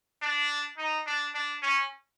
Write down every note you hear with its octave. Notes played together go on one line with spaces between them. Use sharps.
D4
D#4
D4
D4
C#4